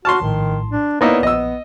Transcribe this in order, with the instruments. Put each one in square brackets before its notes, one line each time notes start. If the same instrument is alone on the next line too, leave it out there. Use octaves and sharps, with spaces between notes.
[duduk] F#4 [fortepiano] A5 C6 [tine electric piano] C#6 F6
[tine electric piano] A#1 A2 [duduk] D#3
[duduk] D4
[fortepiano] A#3 D#4 E4 [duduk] B3 [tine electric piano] B4 C#5 D5
[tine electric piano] A#1 [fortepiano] D#5 E6